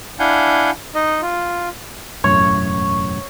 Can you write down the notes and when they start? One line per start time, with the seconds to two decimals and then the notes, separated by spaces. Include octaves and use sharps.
0.19 D4 E4 F5 F#5 G#5 G6
0.95 D#4 D#5
1.22 F4
2.24 E1 F#2 A2 C#5